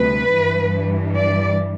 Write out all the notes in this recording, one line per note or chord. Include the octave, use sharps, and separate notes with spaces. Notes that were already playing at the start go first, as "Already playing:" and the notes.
Already playing: D2 C3 G3 B4
G2 E3 G3
D5